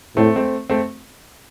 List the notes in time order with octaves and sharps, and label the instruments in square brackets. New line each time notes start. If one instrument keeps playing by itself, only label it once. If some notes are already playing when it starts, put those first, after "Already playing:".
[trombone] A2 [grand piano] A3 C4
[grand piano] A3 C4
A3 C4